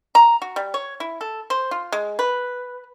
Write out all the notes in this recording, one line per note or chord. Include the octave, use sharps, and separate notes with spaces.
A#5
F#4
G3
C#5
E4
A4
C5
F4
G#3
B4